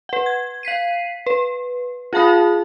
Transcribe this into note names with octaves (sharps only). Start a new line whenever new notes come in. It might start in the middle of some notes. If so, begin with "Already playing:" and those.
B4 F#5
G#6
F5 B6 C7 D#7
B4
F4 G#4 F5 A5 B5 D#6